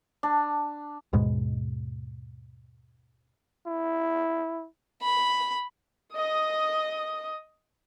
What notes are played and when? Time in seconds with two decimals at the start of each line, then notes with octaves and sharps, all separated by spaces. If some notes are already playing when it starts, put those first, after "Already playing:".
0.23 D4
1.13 D#2 G#2 B2 G#3
3.66 E4
5.02 B5
6.16 D#5 D#6